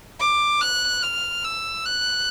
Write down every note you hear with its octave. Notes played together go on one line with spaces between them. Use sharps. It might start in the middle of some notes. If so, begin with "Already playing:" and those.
D6
F#6
F6
E6
F#6